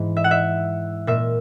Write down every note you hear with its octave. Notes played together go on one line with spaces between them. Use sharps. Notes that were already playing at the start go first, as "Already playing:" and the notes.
Already playing: G#2 E3
E5
F#5
E5
A#2 E5